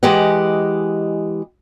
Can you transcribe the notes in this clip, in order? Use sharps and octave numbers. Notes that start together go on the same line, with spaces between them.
E3 G#3 G4 D#5 F#5